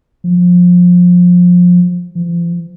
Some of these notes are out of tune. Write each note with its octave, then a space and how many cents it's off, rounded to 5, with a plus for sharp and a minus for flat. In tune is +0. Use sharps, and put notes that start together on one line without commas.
F3 +25
F3 -40